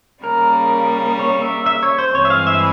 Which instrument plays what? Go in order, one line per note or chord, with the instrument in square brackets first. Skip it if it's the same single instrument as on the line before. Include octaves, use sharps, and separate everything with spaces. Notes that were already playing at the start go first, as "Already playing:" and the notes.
[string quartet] C#3 G3 A#3 [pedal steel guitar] A#4
[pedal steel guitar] C#5
E5
E5
C#5
C5
[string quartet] G2 E3 G#3 C4 [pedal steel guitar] C#5
[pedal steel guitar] E5
F5
E5